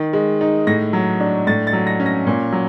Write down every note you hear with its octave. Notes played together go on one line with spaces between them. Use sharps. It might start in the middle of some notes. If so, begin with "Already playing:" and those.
Already playing: D#3
G#3
D#4
A2 A#6
F#3
D4
A2 A6
A6
F#3
A#6
C#4
A#6
A#2
F#3